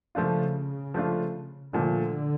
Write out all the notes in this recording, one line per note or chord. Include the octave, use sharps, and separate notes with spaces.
C#3 F3 A3 D4 F4
F3 A3 D4 F4
A#2 D3 F3 A3 D4